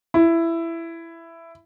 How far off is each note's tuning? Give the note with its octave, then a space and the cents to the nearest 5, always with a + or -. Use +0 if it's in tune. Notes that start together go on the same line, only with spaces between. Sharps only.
E4 +15